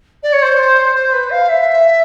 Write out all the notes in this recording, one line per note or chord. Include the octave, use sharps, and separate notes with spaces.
D5
C#5
C5
C5
B4
F5
E5